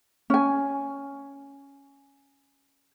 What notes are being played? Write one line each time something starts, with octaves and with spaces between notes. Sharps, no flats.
C#4 G#5